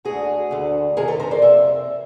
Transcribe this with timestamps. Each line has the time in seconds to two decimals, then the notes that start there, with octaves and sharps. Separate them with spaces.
0.05 D2 D3 F#4 G#4
0.51 D2 D3
0.97 F2 C3 D#3 G#4 A#4
1.08 A4 B4
1.19 A#4 C5
1.31 C5 D5
1.42 F2 C3 E5